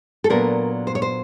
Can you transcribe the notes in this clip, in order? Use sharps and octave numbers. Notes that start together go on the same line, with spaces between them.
A4
A#2 F#3 B3 D4 A#4
C5
C#5
C5